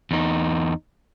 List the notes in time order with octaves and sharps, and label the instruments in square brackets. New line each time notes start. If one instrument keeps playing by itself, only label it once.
[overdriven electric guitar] E2 D#4